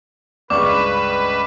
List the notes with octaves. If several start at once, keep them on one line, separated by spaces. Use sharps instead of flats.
C#2 G2 C#3 B4 D5 C#6 D6